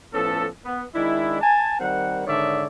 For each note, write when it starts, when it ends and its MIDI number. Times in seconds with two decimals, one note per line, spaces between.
0.13 0.46 45
0.13 0.46 53
0.13 0.46 59
0.13 0.46 61
0.13 0.46 69
0.65 0.84 59
0.95 1.38 51
0.95 1.38 56
0.95 1.38 62
0.95 1.38 64
1.41 1.75 80
1.41 1.75 81
1.80 2.27 51
1.80 2.27 55
1.80 2.27 60
1.80 2.27 70
1.80 2.27 78
2.27 2.67 44
2.27 2.67 50
2.27 2.67 51
2.27 2.67 73
2.27 2.67 74
2.27 2.67 76